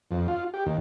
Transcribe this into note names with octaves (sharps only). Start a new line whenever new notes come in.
F2
F4
G4
D#2